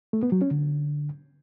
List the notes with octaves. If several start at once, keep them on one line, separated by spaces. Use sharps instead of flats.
A3
B3
F#3
C#4
D3